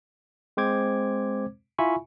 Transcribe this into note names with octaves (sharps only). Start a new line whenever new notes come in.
G#3 C4 C5 D6 G#6
E4 F4 E5 G#5 B5 C#6